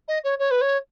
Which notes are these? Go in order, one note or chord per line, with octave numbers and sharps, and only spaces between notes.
D#5
C#5
C#5
B4
C#5